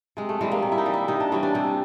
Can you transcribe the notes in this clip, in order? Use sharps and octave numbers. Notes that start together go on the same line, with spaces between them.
C3 G#3
A3
E3 G3 G#3
A#3
C3
E4
D#4
E3 G3
E4
C3 D#4
D4
E3 G3 C#4
D4
C3 C4